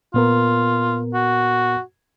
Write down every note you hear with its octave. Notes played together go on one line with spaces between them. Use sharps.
A#2 B3 F4 A#4
F#4